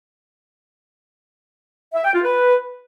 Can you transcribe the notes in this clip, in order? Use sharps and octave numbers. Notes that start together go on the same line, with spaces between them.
E5
G5
F4
B4